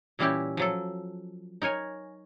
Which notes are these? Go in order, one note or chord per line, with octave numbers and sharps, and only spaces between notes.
A#2 E3 G3 C#4 E4 G4
F3 F#3 A4
D#4 A#4 C#5 G#5